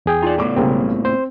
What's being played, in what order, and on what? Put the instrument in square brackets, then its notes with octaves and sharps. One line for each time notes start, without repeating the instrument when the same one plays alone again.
[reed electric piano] E2 G#4 G5
[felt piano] D#4 [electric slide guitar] F4 D5
[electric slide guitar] A2 B3 [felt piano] A3 D5 D6
[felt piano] B1 C#3 [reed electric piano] G3 A#3 C4
[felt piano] C4 [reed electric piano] C5